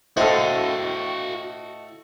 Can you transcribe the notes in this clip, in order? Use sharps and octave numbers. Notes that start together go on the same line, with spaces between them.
A2 F#4 A4 C5 D#5 F5 F#5